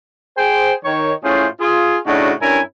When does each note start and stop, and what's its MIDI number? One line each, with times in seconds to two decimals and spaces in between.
0.37 0.73 68
0.37 0.73 72
0.37 0.73 79
0.84 1.12 51
0.84 1.12 73
1.24 1.47 45
1.24 1.47 61
1.24 1.47 64
1.24 1.47 65
1.24 1.47 68
1.24 1.47 72
1.60 1.98 65
1.60 1.98 68
2.06 2.32 45
2.06 2.32 49
2.06 2.32 62
2.06 2.32 63
2.06 2.32 66
2.41 2.60 43
2.41 2.60 61
2.41 2.60 62
2.41 2.60 64
2.41 2.60 70
2.41 2.60 80